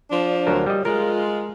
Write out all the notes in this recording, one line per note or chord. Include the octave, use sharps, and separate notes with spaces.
F3 D4
D2 F#3 A#4
G3 D#5
G#3 F4 A#4